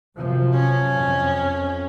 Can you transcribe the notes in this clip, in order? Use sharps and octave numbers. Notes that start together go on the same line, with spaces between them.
F#2 C3 F3
C#4
F2